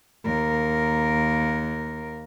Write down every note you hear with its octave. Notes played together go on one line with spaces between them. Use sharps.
D#2 A#4